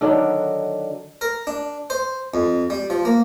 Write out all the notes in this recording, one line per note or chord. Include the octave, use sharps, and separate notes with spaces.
D3 D#3 F#3 D4
A#4
D4
C5
F2
G3
F3
A#3